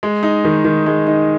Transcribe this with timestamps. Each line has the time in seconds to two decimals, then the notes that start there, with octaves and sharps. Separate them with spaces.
0.03 G#3
0.23 D#4
0.44 D#3
0.65 D#3
0.86 G#3
1.07 D#4